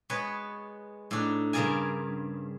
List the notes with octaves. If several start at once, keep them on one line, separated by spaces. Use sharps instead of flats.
G#3 B3 F#4 B4 C#5
A2 D4 D#4
G2 C#3 G#4 A#4 D5 G#5